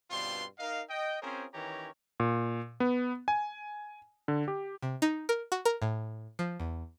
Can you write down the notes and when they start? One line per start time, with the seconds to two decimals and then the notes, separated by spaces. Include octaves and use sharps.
0.10 G2 B2 C4 D4 F4 C6
0.59 D#4 A#4 D#5 F5
0.89 D#5 G5
1.22 C4 C#4 F4 G#4 A#4 C5
1.53 D#3 E3 C#4 G4 C#5 A#5
2.20 A#2
2.80 B3
3.28 G#5
4.28 D3
4.48 G4
4.82 C3
5.02 D#4
5.29 A#4
5.52 F#4
5.65 A#4
5.82 A2
6.39 F3
6.60 E2